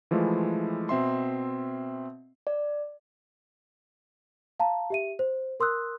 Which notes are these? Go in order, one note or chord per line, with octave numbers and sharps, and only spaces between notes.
E3 F3 G#3 A3 E4 F4
B2 C4 E5 C6
D5
F5 A5 A#5
G4 E5 D#7
C5
A#4 C6 D#6 E6 F#6